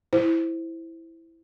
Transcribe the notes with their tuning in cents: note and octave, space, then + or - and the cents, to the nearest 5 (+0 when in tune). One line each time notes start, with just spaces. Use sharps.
E4 +0 C5 +0